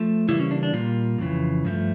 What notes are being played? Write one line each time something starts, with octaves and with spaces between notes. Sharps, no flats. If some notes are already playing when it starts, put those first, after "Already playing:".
Already playing: F3 A3
C#3 E3 G3 A#3 E4
C#4
D4
D4
A#2 G3 A#3 F4
F2 C#3 E3
G2 F3 A3